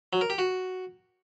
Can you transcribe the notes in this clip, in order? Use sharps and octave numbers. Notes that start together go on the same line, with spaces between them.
F#3
A#4
G4
F#4